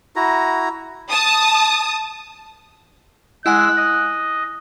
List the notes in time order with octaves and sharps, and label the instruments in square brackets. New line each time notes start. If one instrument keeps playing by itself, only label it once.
[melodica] E4 F#4 A#5
[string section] A5 D#6
[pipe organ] G#3 E6 [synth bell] E4 F#5 G#5 [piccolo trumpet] F#6
[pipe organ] D#5